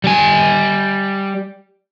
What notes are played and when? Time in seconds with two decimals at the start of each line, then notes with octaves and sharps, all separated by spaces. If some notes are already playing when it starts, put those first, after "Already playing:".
0.04 G3 G#5